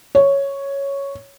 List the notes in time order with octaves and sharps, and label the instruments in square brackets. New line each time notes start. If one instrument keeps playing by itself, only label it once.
[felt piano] C#5